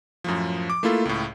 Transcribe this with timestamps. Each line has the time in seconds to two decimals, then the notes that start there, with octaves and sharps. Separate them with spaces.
0.24 F#2 A2 F3
0.70 D6
0.83 A3 A#3 E4 F4 A4
1.05 C#2 A2